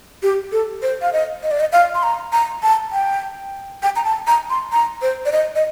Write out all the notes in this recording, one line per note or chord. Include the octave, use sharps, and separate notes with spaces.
G4
A4
C5
F5
D#5
D#5
D5
D#5
F5
C6
A#5
A#5
A5
G5
G5
A#5
A5
A#5
C6
A#5
C5
D5
D#5
D#5